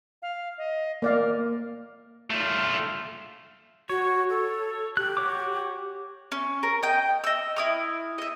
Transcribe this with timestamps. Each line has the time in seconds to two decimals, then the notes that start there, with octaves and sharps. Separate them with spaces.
0.22 F5
0.58 D#5
1.02 A#3 A#4 D5 F5
2.30 A3 F4
3.89 F#4 C#5
4.29 A4
4.97 G4 F#6
5.17 F#4 C#5 D6
6.32 C#4
6.63 A#4
6.83 D#5 G5
7.24 D#5 E6
7.56 E4 D#6 F6
8.18 D#5 E5